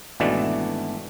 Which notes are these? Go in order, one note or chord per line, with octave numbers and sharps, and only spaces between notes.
G#1 B2 E3 A3 D4 D5